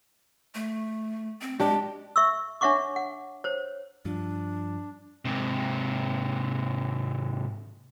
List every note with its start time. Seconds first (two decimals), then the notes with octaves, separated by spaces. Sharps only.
0.55 A3
1.41 C4
1.60 G#3 D4 G4
2.16 E5 C#6 E6
2.61 D4 C#5 E5 F#5 C#6 D6
2.96 F#5
3.44 C5 C#5
4.05 G2 F3 D4
5.25 G#2 C3